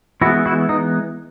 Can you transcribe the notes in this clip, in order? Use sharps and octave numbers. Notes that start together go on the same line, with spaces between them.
E3 G#3 B3 E4 F#4
E4 F#4
D#4